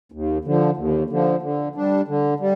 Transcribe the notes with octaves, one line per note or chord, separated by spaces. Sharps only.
D#2
D3 F3
D#2
D3 F3
D3
G3 D4
D3
G3